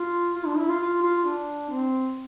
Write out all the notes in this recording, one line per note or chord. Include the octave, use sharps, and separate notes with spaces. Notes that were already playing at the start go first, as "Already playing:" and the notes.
Already playing: F4
F4
D4
E4
F4
F4
F4
D4
C4